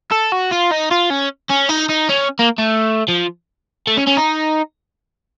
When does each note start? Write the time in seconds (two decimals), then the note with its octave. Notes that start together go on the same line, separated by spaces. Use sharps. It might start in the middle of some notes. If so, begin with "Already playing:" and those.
0.11 A4
0.32 F#4
0.51 F4
0.71 D#4
0.91 F4
1.10 C#4
1.50 C#4
1.69 D#4
1.89 D#4
2.09 C#4
2.39 A#3
2.59 A3
3.08 F3
3.87 A3
3.97 C#4
4.07 C#4
4.17 D#4